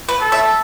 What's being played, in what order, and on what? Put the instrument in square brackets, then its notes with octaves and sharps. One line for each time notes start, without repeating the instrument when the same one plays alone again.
[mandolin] B4
[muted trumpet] A4
[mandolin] E5